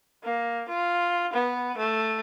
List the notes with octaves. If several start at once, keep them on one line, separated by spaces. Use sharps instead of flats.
A#3
F4
B3
A3